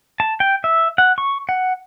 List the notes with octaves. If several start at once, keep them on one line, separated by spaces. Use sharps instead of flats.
A5
G5
E5
F#5
C#6
F#5